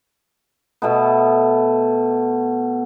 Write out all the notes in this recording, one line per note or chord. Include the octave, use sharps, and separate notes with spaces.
B2 A3 B3